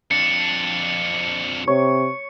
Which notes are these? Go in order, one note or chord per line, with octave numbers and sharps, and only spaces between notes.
F2 D4 C#7
C3 C#5